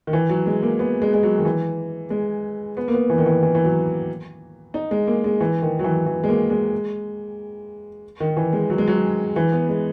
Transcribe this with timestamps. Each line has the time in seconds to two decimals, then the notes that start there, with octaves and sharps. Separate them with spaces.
0.07 D#3
0.13 E3
0.29 F#3
0.46 G#3
0.63 A#3
0.79 B3
1.02 G#3
1.14 G#3
1.23 F#3
1.38 D#3
1.45 E3
2.10 G#3
2.77 B3
2.88 A#3
2.93 B3
3.10 E3
3.18 D#3
3.26 E3
3.43 E3
3.55 E3
3.64 F#3
4.74 D#4
4.91 G#3
5.07 A#3
5.24 G#3
5.40 E3
5.62 D#3
5.79 F#3
5.84 E3
6.06 E3
6.24 G#3
6.28 A#3
6.50 G#3
8.20 D#3
8.37 E3
8.53 G#3
8.70 F#3
8.78 G#3
8.88 F#3
9.36 E3
9.52 B3
9.69 G#3